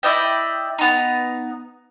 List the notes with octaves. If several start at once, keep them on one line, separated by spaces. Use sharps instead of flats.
E4 D5 D#5 G5
B3 D#4